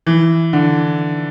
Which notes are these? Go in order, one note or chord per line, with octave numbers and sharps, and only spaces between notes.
E3
D3